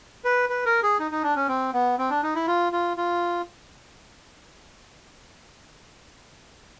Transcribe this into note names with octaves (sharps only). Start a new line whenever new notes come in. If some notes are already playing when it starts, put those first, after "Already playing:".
B4
B4
A#4
G#4
D#4
D#4
D4
C#4
C4
B3
C4
D4
D#4
E4
F4
F4
F4